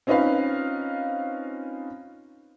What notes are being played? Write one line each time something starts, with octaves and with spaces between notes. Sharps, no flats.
C4 C#4 D#4 F4 B4 F5